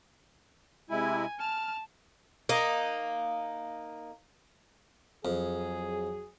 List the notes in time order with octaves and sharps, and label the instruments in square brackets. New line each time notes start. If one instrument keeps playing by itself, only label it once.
[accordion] C3 G#3 E4 [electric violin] G#5
[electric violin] A5 [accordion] F6
[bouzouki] A#3 D#4
[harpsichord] F2 [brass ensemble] F#3 G#4